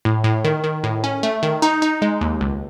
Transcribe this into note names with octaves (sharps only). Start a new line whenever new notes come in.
A2
A2
D#3
D#3
A2
C#4
A3
D#3
D#4
D#4
G#3
D#2
C#2